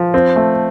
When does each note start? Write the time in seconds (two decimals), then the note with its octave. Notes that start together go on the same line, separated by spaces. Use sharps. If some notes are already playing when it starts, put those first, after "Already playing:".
Already playing: F3
0.14 C4
0.36 A3